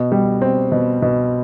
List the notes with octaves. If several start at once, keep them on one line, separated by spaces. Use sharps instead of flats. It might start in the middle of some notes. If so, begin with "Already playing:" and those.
Already playing: B2
G3
C4
B2
B2